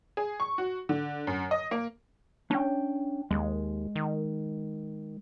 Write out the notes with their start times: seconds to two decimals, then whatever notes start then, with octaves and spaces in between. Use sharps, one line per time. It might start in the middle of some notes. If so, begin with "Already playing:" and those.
0.17 G#4
0.40 C#6
0.58 F#4
0.89 D3
1.27 F#2
1.51 D#5
1.71 A#3
2.51 C#4 D4 G5
3.31 D#2 G#3
3.96 D#3